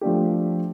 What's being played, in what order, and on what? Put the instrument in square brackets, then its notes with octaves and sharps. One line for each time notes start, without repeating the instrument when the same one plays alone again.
[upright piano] F3 A3 D4 G4